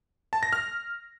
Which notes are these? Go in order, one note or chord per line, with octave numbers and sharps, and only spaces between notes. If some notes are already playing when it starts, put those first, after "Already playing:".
A5
A#6
F6